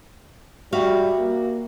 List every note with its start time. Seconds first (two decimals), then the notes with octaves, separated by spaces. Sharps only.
0.72 G3 F#4 E5 F5
1.18 A#3